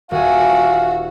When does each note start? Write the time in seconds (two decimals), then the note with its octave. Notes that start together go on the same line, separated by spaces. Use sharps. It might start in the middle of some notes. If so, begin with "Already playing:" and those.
0.11 D#1 F#4 G#4 E5 F5